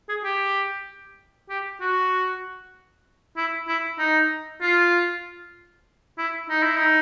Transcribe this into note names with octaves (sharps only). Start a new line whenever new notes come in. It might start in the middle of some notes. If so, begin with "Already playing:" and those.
G#4
G4
G4
F#4
E4
E4
D#4
F4
E4
D#4
E4
D#4